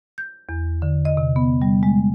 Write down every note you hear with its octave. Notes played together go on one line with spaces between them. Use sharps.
G6
E2
D3
D#5
C3
B3
G3
G#3